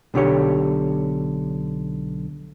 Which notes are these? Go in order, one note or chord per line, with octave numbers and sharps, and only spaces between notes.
B1 D3 G4 C#5